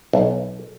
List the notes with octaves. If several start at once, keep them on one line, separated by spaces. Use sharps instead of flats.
B1